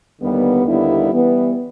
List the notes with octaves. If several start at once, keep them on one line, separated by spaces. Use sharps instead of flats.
D#2 D3 G3 B3
D#2 D3 G3 B3 E4
E3 G3 B3